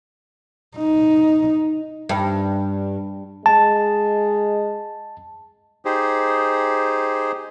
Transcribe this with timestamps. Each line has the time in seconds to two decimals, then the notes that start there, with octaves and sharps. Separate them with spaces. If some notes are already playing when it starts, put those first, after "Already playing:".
0.77 D#4
2.09 G2
3.46 G#3 A5
5.85 D#4 G4 G#4 C5